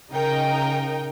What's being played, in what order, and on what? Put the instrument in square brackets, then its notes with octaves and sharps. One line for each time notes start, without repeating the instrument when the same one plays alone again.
[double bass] C#3 [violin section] D#4 A#4 D#5 G5